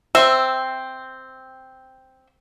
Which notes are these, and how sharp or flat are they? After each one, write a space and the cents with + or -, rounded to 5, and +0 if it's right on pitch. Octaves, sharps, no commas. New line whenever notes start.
C4 +0 E5 +0